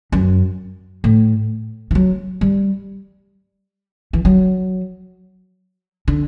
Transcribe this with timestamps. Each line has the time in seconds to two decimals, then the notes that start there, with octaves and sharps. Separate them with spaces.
0.12 F#2
1.04 A2
1.91 E3
1.95 F#3
2.41 G3
4.13 E3
4.25 F#3
6.08 D3